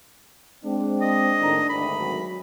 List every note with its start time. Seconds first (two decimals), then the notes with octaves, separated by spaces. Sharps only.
0.64 G#3 C4 D4
1.01 D#5
1.40 A2 D#3 A#5
1.69 G#1 D2 B5
1.99 F#3